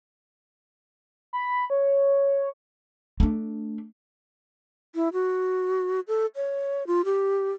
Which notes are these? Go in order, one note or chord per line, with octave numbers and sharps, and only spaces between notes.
B5
C#5
A3 D4
E4
F#4
A4
C#5
F4
G4